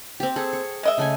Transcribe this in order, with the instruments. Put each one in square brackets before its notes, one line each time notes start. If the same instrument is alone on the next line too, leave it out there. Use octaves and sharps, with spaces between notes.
[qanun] C4 G4
[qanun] G#4 [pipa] A4
[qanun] C#6
[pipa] G#3 D#5 E5
[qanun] C#3 A3 G#5